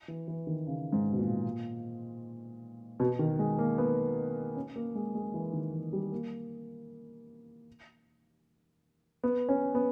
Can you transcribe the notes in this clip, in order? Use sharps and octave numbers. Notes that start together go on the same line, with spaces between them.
E3
E3
D#3
C#3
G#2
B2
A#2
B2
D#3
G#3
A#3
B3
C#4
A#3
G#3
G#3
E3
D#3
E3
G3
A#3
B3
C#4
B3